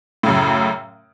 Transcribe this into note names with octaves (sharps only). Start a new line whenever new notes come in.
F#2 A2 C#3